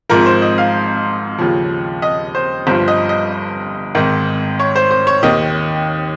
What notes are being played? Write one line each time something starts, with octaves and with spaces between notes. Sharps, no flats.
G#1 G#2 F3 A#4
C5
D#5
F5
D#2 C#3 F3
D#5
C5
G1 G2 F3 C5
D#5
D#5
G#1 G#2 D#3
C#5
C5
C5
C#5
D#2 D#3 D#5